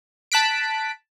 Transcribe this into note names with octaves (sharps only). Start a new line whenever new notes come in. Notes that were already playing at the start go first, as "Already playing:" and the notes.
A5 F#6 B6 D7